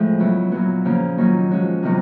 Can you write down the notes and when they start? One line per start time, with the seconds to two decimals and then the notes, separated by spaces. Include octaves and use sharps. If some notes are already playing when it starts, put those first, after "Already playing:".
Already playing: A2 F3 G#3
0.19 C#3 F#3 B3 E4
0.52 A#2 F#3 B3
0.85 C#3 F3 A#3
1.18 D#3 F#3 A#3 C#4
1.51 F3 G#3 C#4 F#4
1.83 C3 D#3 F#3 B3